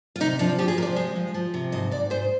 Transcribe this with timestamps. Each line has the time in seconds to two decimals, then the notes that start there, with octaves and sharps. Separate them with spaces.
0.16 F4
0.20 C3 D#4
0.39 F3 D4
0.59 F3 G4
0.68 G#4
0.77 C3 A#4
0.82 D5
0.87 C5
0.96 G#3
1.16 F3
1.34 F3
1.54 C3
1.72 G#2 D#5
1.91 G#2 D5
2.10 G#2 C5